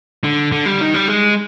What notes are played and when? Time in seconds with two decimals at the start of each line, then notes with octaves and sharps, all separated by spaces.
0.24 D3
0.52 D3
0.66 G3
0.81 D#3
0.94 G3
1.08 G#3